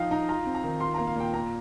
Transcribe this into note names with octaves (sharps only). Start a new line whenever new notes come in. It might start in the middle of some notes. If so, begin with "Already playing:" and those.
Already playing: F3 D#4 F5 G5
D#4 A#5
F4 A#5
C4
A#5
D#3
F4 C6
A#3 A#5
F5
A#2 G5
A#3 A#5